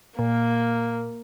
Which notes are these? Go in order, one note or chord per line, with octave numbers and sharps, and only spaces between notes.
A#2 A#3